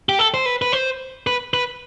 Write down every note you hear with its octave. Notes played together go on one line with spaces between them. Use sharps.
G4
A4
C5
B4
B4
C5
B4
B4